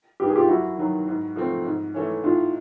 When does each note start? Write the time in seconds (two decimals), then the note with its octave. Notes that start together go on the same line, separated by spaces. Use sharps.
0.20 G2 D#3 G4
0.28 G#4
0.36 F4 G4
0.48 F#2 E4 F#4
0.77 D#3 F#3
1.07 G#2
1.36 F3 A3 C4
1.65 G#2
1.94 E3 A3 C#4
2.24 A2 D#4 F4